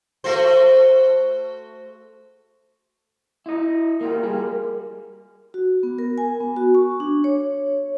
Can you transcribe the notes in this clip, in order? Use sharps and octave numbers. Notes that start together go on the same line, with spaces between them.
A3 F#4 C5
E4 D#5
A#3 F4 G4 A#4
G3 G#4
F#4
B3
A#4
G#5
B3
F#4
C#6
D4
C#5